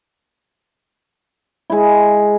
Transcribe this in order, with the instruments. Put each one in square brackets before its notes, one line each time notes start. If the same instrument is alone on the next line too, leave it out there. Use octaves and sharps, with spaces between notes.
[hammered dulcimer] G#3 E4